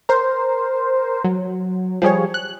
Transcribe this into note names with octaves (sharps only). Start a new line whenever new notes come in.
A#4 C5
F#3
F3 G3 G#4 C#5
F#6